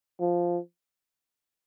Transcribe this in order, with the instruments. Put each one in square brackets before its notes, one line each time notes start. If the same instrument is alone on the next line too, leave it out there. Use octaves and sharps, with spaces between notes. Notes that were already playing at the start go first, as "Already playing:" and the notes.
[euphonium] F3